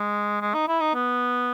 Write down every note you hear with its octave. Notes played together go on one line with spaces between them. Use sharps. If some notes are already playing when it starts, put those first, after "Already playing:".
Already playing: G#3
G#3
D#4
E4
D#4
B3